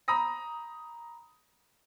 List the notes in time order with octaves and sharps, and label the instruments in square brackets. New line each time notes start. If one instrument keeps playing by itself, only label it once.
[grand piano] A#5 B5 D#6 A#6